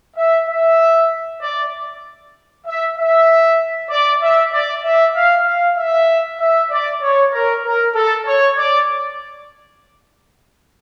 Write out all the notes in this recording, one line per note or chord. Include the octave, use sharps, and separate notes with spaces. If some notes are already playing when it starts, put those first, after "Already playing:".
E5
E5
D5
E5
E5
D5
E5
D5
E5
F5
F5
E5
E5
D5
C#5
A#4
A#4
A4
C#5
D5